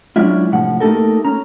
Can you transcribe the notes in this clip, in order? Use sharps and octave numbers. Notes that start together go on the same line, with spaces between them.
F#3 G#3 C#4 D4 E4 F4
C2 A2 F3 F#5
A3 A#3 D#4 G4 A4 A#4
C#4 A#5